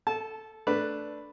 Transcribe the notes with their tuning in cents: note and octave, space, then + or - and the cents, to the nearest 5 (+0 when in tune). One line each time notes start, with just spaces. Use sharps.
A4 +0 A5 -20
A3 +0 D4 +0 B4 +0